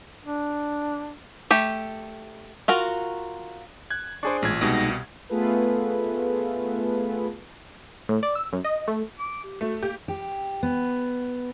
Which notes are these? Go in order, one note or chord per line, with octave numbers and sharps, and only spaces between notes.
D4
A3 G4
F4 F#4 A#4
F#6 G#6
D4 G#4 C5 A5 C#6 D6
A1 A#2 G#3 G#6
C2 B2 G#3 D#4 G4 A#6
A3 B3 F4 G#4 A4 B4
A2
D5
E6
F#2
D#5
A3
D6
G4
A3 F#4
A#3 G4
G4
B3